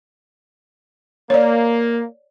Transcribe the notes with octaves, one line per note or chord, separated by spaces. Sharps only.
A#3 C#5 D5